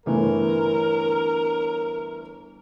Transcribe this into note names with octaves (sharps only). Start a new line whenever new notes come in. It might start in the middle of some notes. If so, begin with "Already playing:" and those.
G1 E3 A3 A#4